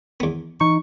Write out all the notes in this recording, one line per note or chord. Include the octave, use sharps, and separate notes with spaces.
E2 B3
E3 D#4 C#6